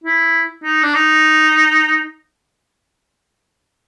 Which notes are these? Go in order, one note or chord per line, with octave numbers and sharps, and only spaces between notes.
E4
D#4
D4
D#4